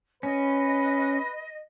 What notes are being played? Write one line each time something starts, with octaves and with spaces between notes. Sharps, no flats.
C#4 B4 D#5